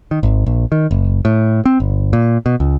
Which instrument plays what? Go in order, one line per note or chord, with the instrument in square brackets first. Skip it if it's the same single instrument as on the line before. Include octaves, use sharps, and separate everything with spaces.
[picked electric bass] D#3
G#1
A#1
D#3
F#1
A2
C4
G1
A#2
B2
C#2